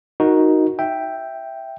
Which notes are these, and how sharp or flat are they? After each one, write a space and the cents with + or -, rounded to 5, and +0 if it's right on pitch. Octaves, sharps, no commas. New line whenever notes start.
D#4 +10 F#4 -5 A#4 +0
E5 +0 G5 +0